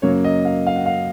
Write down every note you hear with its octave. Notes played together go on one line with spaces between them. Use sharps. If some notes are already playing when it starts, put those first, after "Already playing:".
F#2 C#3 F#3 A#3 C#5
D#5
F5
F5
F#5
F5